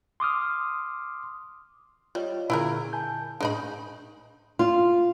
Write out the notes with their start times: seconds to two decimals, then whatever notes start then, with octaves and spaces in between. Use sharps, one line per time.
0.20 C6 D6 D#6 F6
2.15 G3 F4 C#5 D#5
2.50 A#2 D3 E4 G#4 A#4
2.93 G#5 A5 G6
3.41 A2 G#3 D4 D#4 B5
4.59 F4